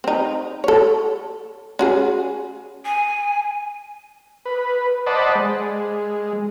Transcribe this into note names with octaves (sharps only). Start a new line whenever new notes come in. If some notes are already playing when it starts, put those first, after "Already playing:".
C4 D#4
A4 C#5
C#4 F#4 G#4
G#5
B4
C5 D5 D#5 F#5 A5 B5
G#3